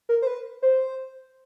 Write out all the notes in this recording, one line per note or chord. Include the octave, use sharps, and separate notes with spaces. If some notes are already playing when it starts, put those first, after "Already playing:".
A#4
C5
B4
C5